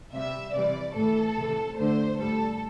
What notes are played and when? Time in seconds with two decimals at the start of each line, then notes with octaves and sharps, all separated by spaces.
0.12 C3 G3 E5
0.53 C3 E3 G3 D5
0.95 A2 E3 A3 A4
1.36 C3 E3 A3
1.77 D3 A3 C5
2.19 A2 G3 A4